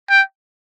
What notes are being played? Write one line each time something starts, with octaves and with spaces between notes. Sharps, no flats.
G5